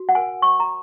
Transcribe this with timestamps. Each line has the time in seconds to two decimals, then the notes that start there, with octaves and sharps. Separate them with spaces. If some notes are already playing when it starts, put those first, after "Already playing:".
Already playing: F#4
0.09 F#5
0.15 A#4 G#5
0.42 C#5 C#6
0.60 A#5